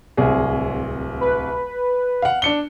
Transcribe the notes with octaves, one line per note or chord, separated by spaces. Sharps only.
D1 C2 G#4
B4
F5 F#5
D4 C#7 G7